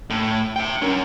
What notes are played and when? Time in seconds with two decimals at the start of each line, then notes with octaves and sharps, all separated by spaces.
0.10 A2
0.56 E5 G5
0.82 C#4 A#4